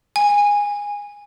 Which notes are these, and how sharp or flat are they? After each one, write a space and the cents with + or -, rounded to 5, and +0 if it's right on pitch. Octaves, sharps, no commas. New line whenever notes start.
G#5 -15